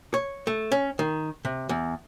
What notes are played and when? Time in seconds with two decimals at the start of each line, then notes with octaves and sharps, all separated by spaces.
0.14 C#5
0.47 A3
0.72 C#4
0.99 D#3
1.45 C3
1.69 E2